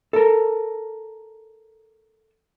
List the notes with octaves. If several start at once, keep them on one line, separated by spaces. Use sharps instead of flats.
A4 A#4